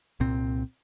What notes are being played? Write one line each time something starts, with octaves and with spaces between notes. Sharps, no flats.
C2 A#2 C4